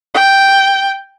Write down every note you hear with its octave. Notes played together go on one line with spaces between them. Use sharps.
G5